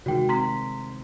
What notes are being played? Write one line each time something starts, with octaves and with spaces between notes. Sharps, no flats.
C3 D#3 G#3 F#4 G5
C4 A#5 C6 B6